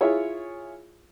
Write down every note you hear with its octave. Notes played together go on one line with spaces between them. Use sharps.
E4 F4 G#4 C#5 E5